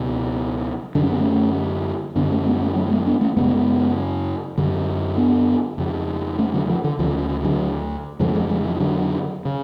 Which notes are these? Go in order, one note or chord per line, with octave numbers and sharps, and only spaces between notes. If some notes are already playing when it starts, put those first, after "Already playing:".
Already playing: C#2 B2
F#2 D3 D4
C#4
B3
A3 C#4
F#2 D3 B3 D4
A3 C#4
G#3 B3
A3 C#4
F#3 A3
G#3 B3
B3 D4
A3 C#4
F#2 C#3 G#3 B3
F#2 D3
B3 D4
F2 C#3
A3 C#4
D3 F#3
F3
D3
D2 C#3 F3
D3 F#3
F2 C#3 F3 G#3
A3
F3 G#3
F3 G#3
F3
D3 F#3
C#3